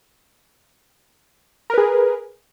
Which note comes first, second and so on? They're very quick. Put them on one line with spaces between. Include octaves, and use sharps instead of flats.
A#4 B4 G#4